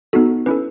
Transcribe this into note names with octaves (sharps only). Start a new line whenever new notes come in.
B3 D#4 F#4 A4
C#4 E4 A4 B4